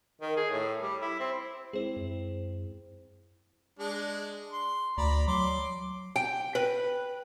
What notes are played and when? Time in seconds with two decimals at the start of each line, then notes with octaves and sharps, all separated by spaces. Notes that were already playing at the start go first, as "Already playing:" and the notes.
0.22 D#3
0.37 G#4
0.51 A2
0.82 G3
1.02 E4
1.20 C4
1.73 G#3 C4 E4 G#4 C5
1.96 F#2
3.79 G#3 D4
4.51 C6
4.97 D2 D5 A#5 B5
5.28 F#3 C6 D6
6.16 G5
6.55 B4